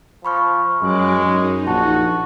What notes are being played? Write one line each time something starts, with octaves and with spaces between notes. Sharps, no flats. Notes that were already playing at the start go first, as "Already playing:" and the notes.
F3 B5 C#6 F6
F#2 F#3 G#3 D6 F#6
F#2 D#4
A#1 F#4 A5